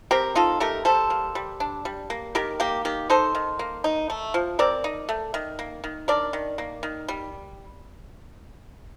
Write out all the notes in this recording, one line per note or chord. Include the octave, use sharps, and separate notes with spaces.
C4 G4 A#4
D#4 F4 A4
A3 G4 A#4
G3 A4 C5
A#3
G3
D4
G3
A#3
D#3 G4 A#4
A#3 G4
D#3 G4
D#4 A4 C5
D#3
A#3
D#4
A3
F3
C4 A#4 D5
D#4
A3
D#3
A#3
D#3
D4 A#4 D5
D#3
A#3
D#3
G3